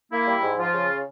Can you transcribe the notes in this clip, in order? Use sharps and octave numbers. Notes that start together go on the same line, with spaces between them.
A#3 E4
G3
G#2
F3 F4
C#3